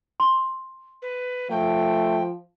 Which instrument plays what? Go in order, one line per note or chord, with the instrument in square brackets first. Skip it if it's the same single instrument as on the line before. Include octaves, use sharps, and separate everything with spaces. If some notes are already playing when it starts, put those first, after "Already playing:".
[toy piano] C6
[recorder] B4
[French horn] F3 [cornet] A3 [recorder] G5